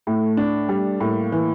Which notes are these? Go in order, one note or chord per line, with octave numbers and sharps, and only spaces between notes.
A2 A3
D4
G3
A2 A#3
E3